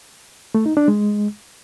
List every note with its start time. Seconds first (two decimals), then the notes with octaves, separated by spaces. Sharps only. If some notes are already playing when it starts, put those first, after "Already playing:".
0.55 A3
0.66 D#4
0.77 D4
0.88 G#3